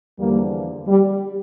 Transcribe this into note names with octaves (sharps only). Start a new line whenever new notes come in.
E2 D3 F3 G3 A#3
G3